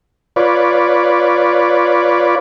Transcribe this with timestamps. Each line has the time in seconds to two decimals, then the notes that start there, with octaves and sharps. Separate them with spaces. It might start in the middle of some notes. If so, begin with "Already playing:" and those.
0.36 F4 B4 C#5 D5